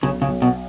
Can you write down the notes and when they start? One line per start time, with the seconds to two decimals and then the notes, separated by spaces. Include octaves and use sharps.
0.03 B1 C#3
0.22 C#3
0.28 B1
0.42 B2